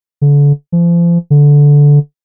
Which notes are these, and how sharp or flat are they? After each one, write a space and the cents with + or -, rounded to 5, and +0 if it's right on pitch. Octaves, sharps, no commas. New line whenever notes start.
D3 -35
F3 -35
D3 -15